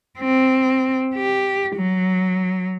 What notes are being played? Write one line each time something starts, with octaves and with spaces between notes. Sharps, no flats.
C4
G4
F#3